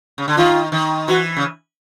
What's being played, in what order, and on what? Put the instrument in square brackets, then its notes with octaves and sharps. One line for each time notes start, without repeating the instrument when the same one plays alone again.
[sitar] C#3
D3
[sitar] D#3 [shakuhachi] F4
[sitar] D#3
[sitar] E3 [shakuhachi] F#4
[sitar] C#3